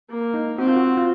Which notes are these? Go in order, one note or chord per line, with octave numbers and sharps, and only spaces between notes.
A#3
D#4
C4 F#4
F4
F#4
F4